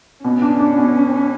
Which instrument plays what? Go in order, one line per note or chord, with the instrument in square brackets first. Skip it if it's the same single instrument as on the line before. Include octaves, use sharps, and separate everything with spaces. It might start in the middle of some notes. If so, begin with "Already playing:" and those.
[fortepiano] B2 [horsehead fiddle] C#4
[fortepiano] D4
D4
B2